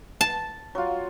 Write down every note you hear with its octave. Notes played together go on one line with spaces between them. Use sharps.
A5
F#3 F4